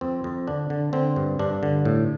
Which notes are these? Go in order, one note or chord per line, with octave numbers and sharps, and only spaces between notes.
F2 C4
F2
D3 D4
D3
D3 C4
G2
G2 D4
D3
A2